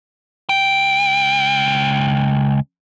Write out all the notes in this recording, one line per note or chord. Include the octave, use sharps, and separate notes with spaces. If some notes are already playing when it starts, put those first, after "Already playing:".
C#2 G5